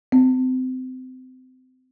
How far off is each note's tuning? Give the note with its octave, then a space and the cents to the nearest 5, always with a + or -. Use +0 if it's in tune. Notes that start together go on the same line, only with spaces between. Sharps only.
C4 -30